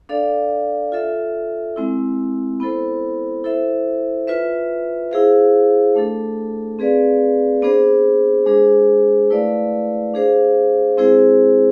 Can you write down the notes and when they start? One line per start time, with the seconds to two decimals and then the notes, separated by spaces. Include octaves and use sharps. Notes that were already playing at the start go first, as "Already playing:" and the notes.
0.09 D4 A4 D5 F5
0.92 F4 A4 E5
1.76 G#3 C4 E4
2.60 B3 E4 A4 C5
3.44 E4 A4 C5 E5
4.27 F4 B4 E5
5.11 E4 G#4 C5 F5
5.95 A3 D4 A4
6.79 C4 G#4 B4 D5 F5
7.62 B3 D4 G#4 C5
8.46 G#3 D4 G#4 C5
9.30 A3 E4 B4 D5 F5
10.14 D4 G#4 C5 F5
10.97 G#3 C4 E4 G#4 C5